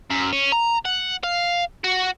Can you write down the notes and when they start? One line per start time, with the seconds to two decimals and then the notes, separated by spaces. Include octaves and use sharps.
0.10 F#2
0.33 C#4
0.52 A#5
0.85 F#5
1.23 F5
1.84 F#4